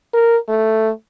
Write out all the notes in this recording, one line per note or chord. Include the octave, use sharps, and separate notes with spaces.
A#4
A3